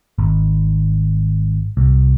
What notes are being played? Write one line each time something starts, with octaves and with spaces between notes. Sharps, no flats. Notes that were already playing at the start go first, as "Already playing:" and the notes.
G#1
C2